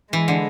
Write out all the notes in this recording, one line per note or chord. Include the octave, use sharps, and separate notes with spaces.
E3 G#3
D3